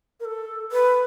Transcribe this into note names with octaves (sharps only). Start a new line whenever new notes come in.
A#4
A4
B4